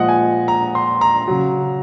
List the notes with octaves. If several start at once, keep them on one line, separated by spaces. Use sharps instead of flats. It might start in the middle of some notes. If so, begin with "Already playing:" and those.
Already playing: A#2 F3 G#3 D#5 F#5
G#5
A#5
C6
A#5
C#3 F#3